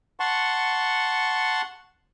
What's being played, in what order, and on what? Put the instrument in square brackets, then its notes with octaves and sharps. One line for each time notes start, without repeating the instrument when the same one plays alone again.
[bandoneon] F#5 A5 C6 C#6